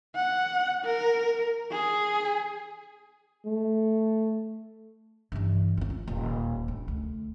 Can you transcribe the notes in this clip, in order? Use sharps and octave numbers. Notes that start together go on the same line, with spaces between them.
F#5
A#4
G#4
A3
G2 E3
C4 C#4
F4
D#1
D4
D2